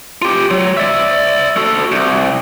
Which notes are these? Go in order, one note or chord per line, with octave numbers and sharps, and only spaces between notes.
F4 G4
F#3
D5 E5
F#4 A4
C2